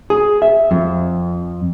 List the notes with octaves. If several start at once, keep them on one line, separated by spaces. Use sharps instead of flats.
G#4
E5
F2